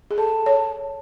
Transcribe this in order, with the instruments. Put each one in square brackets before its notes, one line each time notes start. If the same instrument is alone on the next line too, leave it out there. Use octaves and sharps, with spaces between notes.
[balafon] G#4
[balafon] A4 [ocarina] A5
[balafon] C#5